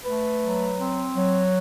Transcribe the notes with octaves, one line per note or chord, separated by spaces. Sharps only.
A3 B4
F#3
C4
F#3